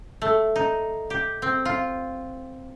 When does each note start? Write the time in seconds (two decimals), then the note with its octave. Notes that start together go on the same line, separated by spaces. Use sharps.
0.22 A3
0.56 D#4
1.10 G4
1.42 C4
1.65 F4